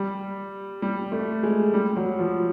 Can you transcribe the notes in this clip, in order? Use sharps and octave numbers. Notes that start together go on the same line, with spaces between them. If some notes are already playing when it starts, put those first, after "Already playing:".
Already playing: G3
G3
A3
G#3
G3
F#3
F3